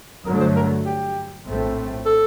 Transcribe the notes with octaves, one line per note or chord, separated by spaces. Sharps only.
G2 D3 F#3 A3 A#4
C5
A#4
G4
A#1 A2 A3 C4
A4